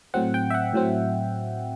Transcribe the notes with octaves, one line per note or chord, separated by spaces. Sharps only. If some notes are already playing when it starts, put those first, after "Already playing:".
A2 F#3 C4 F#5
G5
E5
F#5
A2 F#3 C4